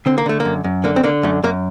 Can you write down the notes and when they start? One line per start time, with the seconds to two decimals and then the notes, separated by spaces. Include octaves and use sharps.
0.06 D3 C4
0.18 A#3
0.26 D3 A3
0.40 A#3
0.45 F#2
0.64 F#2
0.84 D3 A#3
0.96 C4
1.04 D3 A#3
1.23 F#2 A3
1.43 F#2 A#3